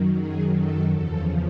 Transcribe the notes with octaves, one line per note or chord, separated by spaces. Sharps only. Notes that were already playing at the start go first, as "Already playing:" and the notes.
Already playing: F#2 D#3 F#3
G#4
A4
E2 C#3 F3 A4